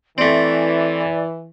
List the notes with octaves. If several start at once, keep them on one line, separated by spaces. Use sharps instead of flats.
E3 A3 C4 D5